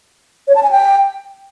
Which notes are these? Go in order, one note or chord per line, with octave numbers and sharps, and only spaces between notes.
C#5
A5
G#5
G5